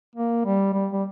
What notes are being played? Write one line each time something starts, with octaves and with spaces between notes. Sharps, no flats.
A#3
G3
G3
G3